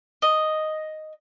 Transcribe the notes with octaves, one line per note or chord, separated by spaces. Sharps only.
D#5